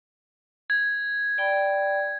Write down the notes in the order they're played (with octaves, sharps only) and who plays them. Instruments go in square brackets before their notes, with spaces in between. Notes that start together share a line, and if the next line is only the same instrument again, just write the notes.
[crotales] G#6
[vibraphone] D5 G5 B5